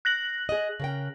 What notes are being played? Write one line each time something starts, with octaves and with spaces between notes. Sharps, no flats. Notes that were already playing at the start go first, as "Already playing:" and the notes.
F#6 A#6 F#7
G#4 D#5
C#3 A#4 G5